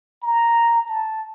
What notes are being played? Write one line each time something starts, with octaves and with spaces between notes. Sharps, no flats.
A#5
A5